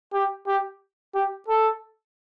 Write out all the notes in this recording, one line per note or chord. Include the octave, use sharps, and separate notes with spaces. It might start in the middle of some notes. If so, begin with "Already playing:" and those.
G4
G4
G4
A4